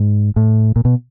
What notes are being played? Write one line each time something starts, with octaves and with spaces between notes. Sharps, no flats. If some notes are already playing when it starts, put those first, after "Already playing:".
Already playing: G#2
A2
A#2
B2